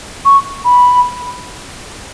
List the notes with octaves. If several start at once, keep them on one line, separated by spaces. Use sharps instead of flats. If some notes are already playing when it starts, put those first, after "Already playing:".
C#6
B5